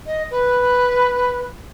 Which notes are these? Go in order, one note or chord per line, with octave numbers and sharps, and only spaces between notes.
D#5
B4